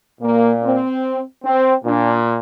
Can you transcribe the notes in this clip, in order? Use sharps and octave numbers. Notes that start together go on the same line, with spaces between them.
A#2 A#3
C4
C4
A#2 D4